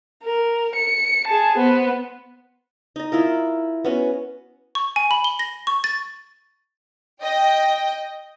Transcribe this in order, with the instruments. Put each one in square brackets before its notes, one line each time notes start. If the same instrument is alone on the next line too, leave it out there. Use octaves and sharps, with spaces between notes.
[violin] A#4
C#7
G#4 A5
B3 C5
[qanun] D#4 D#5
E4 F4 A#4
B3 C#4 F#4
[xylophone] C#6
G#5
B5
G7
A#6
C#6
A6
[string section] D#5 G5